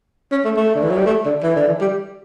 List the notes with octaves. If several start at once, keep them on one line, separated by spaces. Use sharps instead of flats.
C#4
A3
A3
D3
E3
F#3
G3
A3
D3
E3
D3
E3
G3